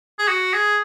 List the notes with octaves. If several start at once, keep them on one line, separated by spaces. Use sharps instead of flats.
G#4
F#4
G#4